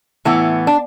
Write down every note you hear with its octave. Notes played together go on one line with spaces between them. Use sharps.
A2 E3 B3
D4